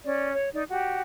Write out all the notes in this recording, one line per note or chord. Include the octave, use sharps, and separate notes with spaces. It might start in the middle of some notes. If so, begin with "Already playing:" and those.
C#4 D5
C#5
D#4 D5
F#4 G4